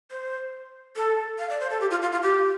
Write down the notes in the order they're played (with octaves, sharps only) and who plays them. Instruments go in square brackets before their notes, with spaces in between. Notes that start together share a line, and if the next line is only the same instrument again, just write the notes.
[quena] C5
A4
F5
D5
C5
A4
G4
F4
F4
F4
G4